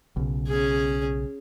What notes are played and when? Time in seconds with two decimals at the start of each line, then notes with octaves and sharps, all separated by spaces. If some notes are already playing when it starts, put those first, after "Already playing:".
0.16 B1 C#3
0.47 C#4 G#4